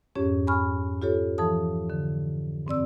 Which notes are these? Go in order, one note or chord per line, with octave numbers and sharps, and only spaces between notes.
F2 G#2 C#4 G4 C#5
G#5 B5 C#6 F6
F4 G4 A4 C#5
E3 F3 A4 A5 D#6
D3
G2 C4 D5 E6